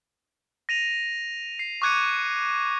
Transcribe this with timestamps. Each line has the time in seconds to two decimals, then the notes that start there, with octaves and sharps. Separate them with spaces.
0.69 A#6 D#7 F7
1.59 C7
1.82 C#6 D6 F#6 G#6 C#7 D#7